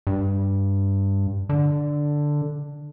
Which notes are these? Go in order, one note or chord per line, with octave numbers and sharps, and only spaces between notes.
G2
D3